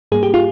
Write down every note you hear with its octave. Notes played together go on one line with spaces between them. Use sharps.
G#2 G3 A#3 G#4
G4
F4